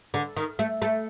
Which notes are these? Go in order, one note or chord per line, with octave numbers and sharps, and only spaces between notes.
D3
D#3
A3
A3